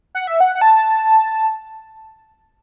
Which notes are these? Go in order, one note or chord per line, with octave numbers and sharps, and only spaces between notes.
F#5
E5
F#5
F#5
A5